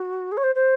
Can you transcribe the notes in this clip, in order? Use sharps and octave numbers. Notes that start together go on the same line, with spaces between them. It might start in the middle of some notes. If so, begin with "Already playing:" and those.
Already playing: F#4
G#4
C#5
C5
C5